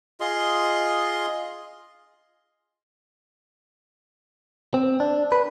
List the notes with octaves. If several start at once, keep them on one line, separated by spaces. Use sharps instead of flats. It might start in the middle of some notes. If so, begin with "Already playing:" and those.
F4 G#4 D#5 C6
C4
D4
B4